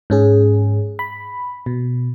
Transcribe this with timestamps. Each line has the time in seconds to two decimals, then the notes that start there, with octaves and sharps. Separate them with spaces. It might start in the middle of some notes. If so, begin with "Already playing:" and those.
0.10 G#2 C#4 G#4
0.99 B5
1.66 B2